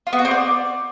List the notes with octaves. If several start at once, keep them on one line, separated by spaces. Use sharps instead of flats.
F4
B3
F#4
C4
D5